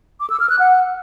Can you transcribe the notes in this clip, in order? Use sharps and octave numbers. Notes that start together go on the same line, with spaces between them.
D6
E6
F6
F#6
F#5